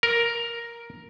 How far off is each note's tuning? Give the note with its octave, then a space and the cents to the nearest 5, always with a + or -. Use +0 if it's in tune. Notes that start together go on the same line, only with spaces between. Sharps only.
A#4 +5